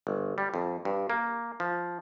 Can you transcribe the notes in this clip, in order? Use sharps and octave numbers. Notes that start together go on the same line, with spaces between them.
G1
G3
F2
G2
A#3
F3